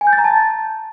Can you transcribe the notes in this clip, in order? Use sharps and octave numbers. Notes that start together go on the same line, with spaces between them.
G#5
G6
A6
A#5
A5